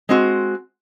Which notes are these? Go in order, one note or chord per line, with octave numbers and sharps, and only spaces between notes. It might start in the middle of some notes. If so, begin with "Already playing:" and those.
G#3 C4 F#4